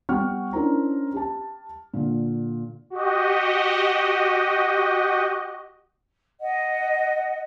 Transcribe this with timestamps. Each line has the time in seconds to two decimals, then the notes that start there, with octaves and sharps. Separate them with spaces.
0.09 G3 B3 F#5 G5 C#6 F6
0.53 C#4 D4 E4 A#4 C5 A#5
1.13 G4 A5
1.94 A#2 D3
2.90 F#4 G4 D#5
6.40 D#5 F#5